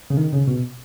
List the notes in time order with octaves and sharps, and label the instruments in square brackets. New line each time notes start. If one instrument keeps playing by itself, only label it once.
[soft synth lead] C#3
D#3
C#3
B2